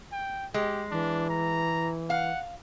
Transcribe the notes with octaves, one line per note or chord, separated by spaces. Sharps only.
G5
G#3 G4
E3 D4
A#5
F5 F#5